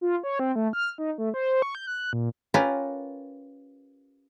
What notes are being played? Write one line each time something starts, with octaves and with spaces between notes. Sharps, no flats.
F4
C#5
C4
A3
F6
D#4
A3
C5
C#6
G6
F#6
A#2
C#4 F4 G4 A#4 B4